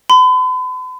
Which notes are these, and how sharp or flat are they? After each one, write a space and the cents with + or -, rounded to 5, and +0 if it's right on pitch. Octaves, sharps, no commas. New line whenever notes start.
B5 +45